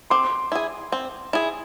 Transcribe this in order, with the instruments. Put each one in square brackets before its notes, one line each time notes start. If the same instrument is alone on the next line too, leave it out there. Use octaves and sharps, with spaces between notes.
[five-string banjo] C4 [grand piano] C6 D6
[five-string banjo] E4 G#4
C4
E4 G#4